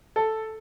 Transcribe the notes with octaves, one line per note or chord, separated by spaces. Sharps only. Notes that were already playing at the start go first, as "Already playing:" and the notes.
A4